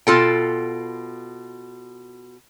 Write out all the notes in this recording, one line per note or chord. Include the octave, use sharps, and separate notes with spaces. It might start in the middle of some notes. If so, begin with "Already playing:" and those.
B2 F4 A4 G5